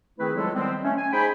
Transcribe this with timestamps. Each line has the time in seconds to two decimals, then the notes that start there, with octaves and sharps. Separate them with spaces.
0.19 D#3 A3 C4 E4 G#4 B4
0.35 F3 F#3 G#3 E4 F4 A4
0.55 D#3 G3 G#3 B3 C4
0.84 A3 C#4
0.98 G#5
1.13 D#4 G#4 C5 G5 G#5 B5